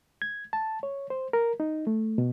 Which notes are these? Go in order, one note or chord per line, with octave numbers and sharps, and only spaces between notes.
G#6
A5
C#5
C5
A#4
D#4
A3
B2